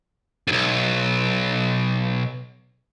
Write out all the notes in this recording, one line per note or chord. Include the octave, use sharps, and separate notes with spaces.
B1 F2